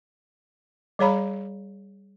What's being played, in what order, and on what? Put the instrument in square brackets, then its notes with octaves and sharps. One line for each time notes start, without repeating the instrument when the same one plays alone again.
[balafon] G3 G#4 C#5 F5 A#5 B5